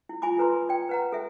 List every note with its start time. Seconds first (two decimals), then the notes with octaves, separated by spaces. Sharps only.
0.09 E4
0.22 F4 G#5 B5 D6
0.37 F4 A4 B4 A#5 C6
0.69 D5 G5
0.89 B4 F#5 A#5
1.12 A4 E5